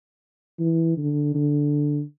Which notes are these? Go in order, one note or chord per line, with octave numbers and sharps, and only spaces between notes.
E3
D3
D3